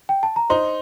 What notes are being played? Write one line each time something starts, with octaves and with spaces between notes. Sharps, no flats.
G5
A5
A#5
D#4 C5 C6